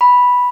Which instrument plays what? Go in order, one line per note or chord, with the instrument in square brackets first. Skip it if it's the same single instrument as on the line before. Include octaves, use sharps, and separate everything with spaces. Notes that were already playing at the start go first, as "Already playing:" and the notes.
[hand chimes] B5